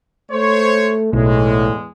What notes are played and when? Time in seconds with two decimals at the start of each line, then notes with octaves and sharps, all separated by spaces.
0.31 A3 C5 C#5
1.13 B1 E2 A2 G#3